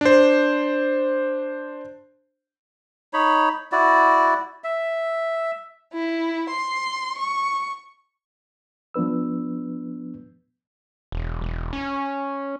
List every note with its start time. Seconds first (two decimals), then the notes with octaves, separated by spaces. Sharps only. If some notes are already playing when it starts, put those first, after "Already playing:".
0.01 D4 C5
3.13 D#4 C#5 B5
3.72 E4 F#4 D5
4.64 E5
5.94 E4
6.49 C6
7.17 C#6
8.94 F3 B3 D4 B4 E6
11.12 E1
11.42 E1
11.73 C#4